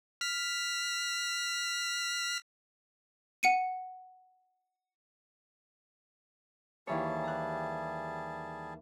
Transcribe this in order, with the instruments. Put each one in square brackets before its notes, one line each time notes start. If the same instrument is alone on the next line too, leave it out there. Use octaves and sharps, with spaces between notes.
[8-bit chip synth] F6 B6
[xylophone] F#5 C#7 D#7
[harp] D#2 E3 C#5 [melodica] G3 G#4 A5
[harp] A#5 F#6